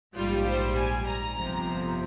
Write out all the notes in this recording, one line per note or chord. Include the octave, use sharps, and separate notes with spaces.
A#1 G#2 G3 F4
C5
G#5
A#5
G1 F2 C3 F3